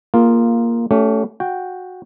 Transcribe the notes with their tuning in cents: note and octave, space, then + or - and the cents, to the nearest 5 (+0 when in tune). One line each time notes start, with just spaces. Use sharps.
A#3 +0 F4 +0 G#4 +25
A3 +0 C#4 +20 G4 -30
F#4 -15 G5 +0